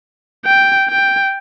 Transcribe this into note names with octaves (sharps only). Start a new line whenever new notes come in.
G5
G5